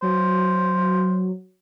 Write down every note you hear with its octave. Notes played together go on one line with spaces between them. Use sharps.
F#3 C5